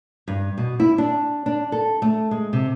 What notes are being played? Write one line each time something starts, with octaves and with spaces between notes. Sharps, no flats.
G2
B2
E4
D4
D4
A4
A3
G#3
C3